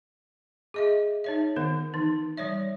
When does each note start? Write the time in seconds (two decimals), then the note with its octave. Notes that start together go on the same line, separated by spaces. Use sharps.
0.74 G#4 D#5 E5
1.24 D#4 C#5 E5
1.56 D#3 B3 C5
1.94 E3 D#4
2.37 G3 C#5 D5 E5